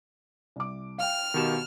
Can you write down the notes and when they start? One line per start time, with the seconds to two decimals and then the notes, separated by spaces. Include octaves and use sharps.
0.56 C2 D6
0.98 F5 G5 F6
1.34 B2 D#3 G4 E7